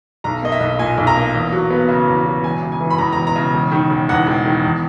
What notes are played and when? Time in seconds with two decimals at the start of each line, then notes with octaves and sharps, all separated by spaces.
0.24 B1 A#5
0.42 A#3 D#5
0.52 E5
0.60 B1
0.79 A#2 G#5
0.98 B1
1.07 A#5
1.16 A#3
1.35 E2
1.52 F#3
1.71 B3
1.89 C#3
2.07 E2
2.26 F#3
2.44 E1 G#5
2.62 C#3
2.72 G#5
2.80 E3
2.90 B5
2.98 E2 A#5
3.12 A#5
3.17 E1
3.27 A#5
3.36 C#3
3.53 E1
3.72 D#3
3.90 E1
4.09 E2 F#5
4.27 E1
4.46 D#3
4.64 E2